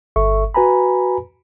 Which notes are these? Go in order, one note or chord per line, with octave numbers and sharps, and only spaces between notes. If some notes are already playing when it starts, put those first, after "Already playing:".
G1 A4 E5 C#6
F#4 B4 G#5 A#5 B5